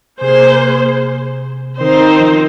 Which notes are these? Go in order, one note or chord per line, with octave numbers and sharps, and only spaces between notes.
C3 A#3 G#4 C5
D#3 C4 D#4 C5
D#3
F3